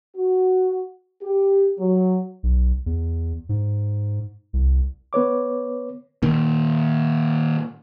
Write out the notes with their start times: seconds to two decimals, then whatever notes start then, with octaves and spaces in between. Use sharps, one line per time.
0.16 F#4
1.22 G4
1.79 F#3
2.43 B1
2.86 E2
3.49 G#2
4.53 C2
5.13 B3 B4 C#5 D6
6.23 A#2 D#3